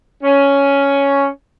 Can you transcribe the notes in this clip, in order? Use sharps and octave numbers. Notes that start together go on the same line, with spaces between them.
C#4